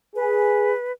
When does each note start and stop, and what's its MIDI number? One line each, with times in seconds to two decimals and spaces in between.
0.16 0.73 68
0.16 0.92 71